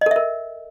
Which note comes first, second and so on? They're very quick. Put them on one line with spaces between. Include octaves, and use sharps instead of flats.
D#5 A4 E5 A#4